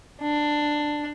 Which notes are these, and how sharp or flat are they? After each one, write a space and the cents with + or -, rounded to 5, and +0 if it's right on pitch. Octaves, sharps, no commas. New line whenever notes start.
D4 +10